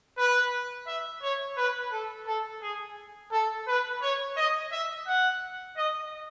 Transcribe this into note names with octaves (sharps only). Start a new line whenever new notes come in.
B4
E5
C#5
B4
A4
A4
G#4
A4
B4
C#5
D#5
E5
F#5
D#5